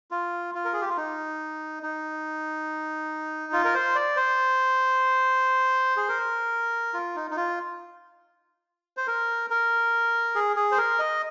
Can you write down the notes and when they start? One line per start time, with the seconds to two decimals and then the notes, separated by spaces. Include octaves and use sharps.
0.11 F4
0.55 F4
0.65 A#4
0.73 G#4
0.81 G4
0.89 F4
0.97 D#4
1.83 D#4
3.53 F4
3.65 A#4
3.74 C5
3.95 D5
4.17 C5
5.97 G#4
6.08 A#4
6.94 F4
7.16 D#4
7.31 D#4
7.37 F4
8.97 C5
9.07 A#4
9.50 A#4
10.35 G#4
10.56 G#4
10.72 C5
10.78 A#4
10.99 D#5